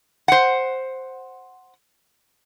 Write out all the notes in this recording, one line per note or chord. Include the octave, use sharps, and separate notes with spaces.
C5 F#5